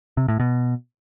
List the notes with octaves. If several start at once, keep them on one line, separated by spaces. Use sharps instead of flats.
C3
A2
B2